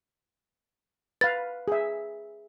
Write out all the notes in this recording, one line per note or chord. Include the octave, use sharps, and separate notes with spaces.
B4 F5 A6
G#4 E5